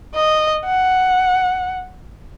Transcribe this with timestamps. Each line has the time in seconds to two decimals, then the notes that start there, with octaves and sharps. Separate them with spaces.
0.15 D#5
0.66 F#5